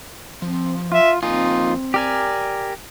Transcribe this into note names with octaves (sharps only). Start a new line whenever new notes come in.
F3 C4
F4 E5
F2 A#3 C4 D#4 F4 G#5
G4 A#4 D5 G#5